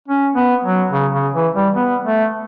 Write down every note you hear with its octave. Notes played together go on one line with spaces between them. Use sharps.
C#4
B3
F#3
C#3
C#3
E3
G3
B3
A3